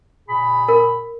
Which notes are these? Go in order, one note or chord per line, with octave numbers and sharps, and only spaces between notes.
A#2 G#4 B5
A#4